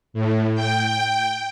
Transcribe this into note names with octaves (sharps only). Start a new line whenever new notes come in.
A2
G5